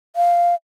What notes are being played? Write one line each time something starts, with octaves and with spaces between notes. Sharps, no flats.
F5